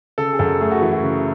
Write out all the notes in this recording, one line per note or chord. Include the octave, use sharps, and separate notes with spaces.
C#3 A4
G#4
F#2 A4
A3 G#4
F#4
E3 E4
F#4
C#3